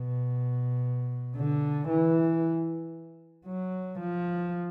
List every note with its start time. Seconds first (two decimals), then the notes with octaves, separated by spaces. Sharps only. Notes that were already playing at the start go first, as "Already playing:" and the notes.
Already playing: B2
1.36 D3
1.89 E3
3.46 F#3
4.00 F3